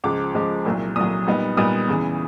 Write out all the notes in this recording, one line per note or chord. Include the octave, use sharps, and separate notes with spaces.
C#2 C#3 F3 G#3 D6
C#2 C#3 F3 G#3
C2 A#2 F#3
C2 A#2 F#3 D#6
A#2 G3 B3 D#4
A#2 G3 B3 D#4 D#6
E2 C#3 E3